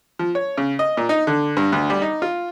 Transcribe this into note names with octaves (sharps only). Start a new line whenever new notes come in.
F3
C#5
C#3
D#5
A#2
D#4
D3
G2
D2
G3
D#4
F4